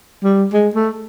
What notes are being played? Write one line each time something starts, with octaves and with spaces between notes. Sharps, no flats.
G3
G#3
A3